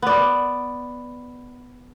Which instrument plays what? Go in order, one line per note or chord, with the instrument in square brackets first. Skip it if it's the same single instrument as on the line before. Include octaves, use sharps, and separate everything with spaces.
[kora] B3 D5